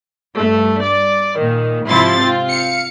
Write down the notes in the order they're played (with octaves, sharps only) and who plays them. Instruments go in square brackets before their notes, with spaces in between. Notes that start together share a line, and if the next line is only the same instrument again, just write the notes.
[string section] G2 A3
D5
A#2 D#3
G#2 C3 F3 E4 C6 A6
C4 F4
F5 C#7